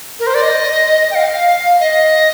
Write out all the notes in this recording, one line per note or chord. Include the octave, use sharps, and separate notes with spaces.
A#4
C5
D5
D#5
G5
F5
D#5